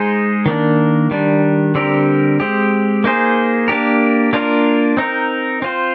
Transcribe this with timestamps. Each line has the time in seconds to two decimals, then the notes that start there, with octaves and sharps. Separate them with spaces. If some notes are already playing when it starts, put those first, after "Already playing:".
Already playing: G#3 D#4 G#4 C5
0.46 D#3 A#3 D4
1.11 D#3 G3 D4
1.75 D3 G3 C4 G4 A#4
2.40 G#3 C4 G4
3.04 A#3 D#4 G#4 C5
3.68 A#3 D4 G4 A#4
4.33 A#3 D4 F4 A#4
4.97 C4 D#4 A#4
5.62 C4 F4 C5